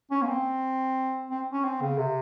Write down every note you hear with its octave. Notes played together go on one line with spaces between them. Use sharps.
C#4
A#3
C4
C4
C#4
C4
C#3
C3